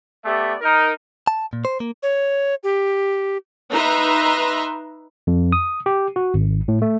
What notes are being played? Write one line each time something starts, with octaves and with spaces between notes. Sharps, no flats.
A3 B3 G4 D5 E5
D#4 A#4
A5
A#2
C5
A#3
C#5
G4
D#4 B4 E5 A#5 C6
F2
D#6
G4
F#4
G#1
A2
A3